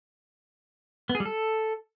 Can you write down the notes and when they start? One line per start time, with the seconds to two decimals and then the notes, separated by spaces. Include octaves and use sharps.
1.09 B3
1.15 G#4
1.20 G3
1.25 A4